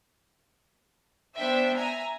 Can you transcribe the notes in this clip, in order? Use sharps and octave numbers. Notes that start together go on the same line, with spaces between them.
B3 D4 C5 E5 G5
E5 G#5 A#5